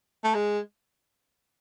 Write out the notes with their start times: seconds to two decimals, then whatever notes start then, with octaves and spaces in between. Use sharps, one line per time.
0.24 A3
0.35 G#3